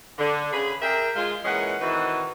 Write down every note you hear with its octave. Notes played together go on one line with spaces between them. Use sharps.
D3
C#3 G#4 B5
G#4 A#4 E5 G5
G#3 F4
A#2 E3 G#3 C#4 D#5 F#5
D#3 E3 C4 D#4 F#4